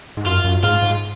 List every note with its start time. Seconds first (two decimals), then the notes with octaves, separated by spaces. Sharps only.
0.17 G#2
0.26 F#2 F4
0.44 F#2
0.63 G#2 F4
0.82 G#2